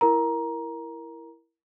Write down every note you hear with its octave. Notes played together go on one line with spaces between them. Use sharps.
E4 A#4 A#5